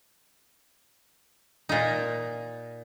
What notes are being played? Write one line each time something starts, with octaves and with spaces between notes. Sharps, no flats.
A#2 D#4